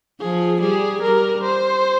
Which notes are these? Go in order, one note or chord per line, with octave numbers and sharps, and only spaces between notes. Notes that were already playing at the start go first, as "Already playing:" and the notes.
F3 G#4
G3 G#4
G3 A#4
C5